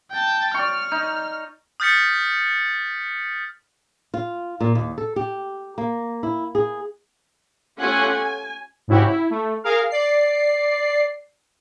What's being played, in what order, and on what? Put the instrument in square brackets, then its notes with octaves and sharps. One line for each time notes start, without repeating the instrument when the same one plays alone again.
[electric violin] G5 A5
[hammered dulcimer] D5 C#6 [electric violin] F6
[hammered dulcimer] D#4
[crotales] D#6 F6 G6 A6 B6 C#7
[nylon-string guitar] F4
A#2
D#2
A4
G4
A#3
E4
G#4
[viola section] A3 C#4 F4 G4 F#5 G#5
G#5
[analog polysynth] G#2 C#3 E4 F#4 G4
E4
A3
G#4 A#4 F5
D5 C7